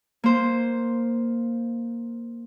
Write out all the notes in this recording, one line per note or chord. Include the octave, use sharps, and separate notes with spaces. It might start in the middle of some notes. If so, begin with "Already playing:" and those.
A#3 C5